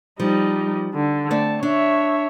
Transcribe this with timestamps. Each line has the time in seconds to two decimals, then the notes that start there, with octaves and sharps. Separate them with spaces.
0.20 F3 G3 D#4
0.94 D3
1.31 A3 C4 D5 A5
1.63 D4 C#5 E5